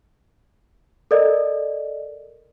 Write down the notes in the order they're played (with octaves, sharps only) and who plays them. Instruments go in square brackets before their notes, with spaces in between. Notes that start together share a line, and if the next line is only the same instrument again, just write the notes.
[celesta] A4 A#4 D5 D#5